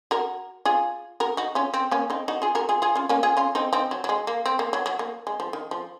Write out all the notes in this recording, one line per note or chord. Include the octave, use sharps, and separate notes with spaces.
F#4 A#4
F4 G#4
F#4 A#4
D#4 F#4
C#4 F4
C4
A#3 C#4
C4 D#4
D#4 F#4
F4 G#4
F#4 A#4
F4 G#4
F4 G#4
C#4 F4
A#3 C#4
F4 G#4
C#4 F4
C4 D#4
C4 D#4
F#3
F#3
G#3
A#3
C4
A#3
F#3
F#3
A#3
G#3
F3
D#3
F3